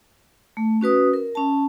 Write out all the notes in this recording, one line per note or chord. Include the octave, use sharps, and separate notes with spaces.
A3
C#4 F#4 B4 D#6
A#4
C#4 A5